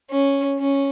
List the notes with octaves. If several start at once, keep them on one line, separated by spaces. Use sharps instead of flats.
C#4
C#4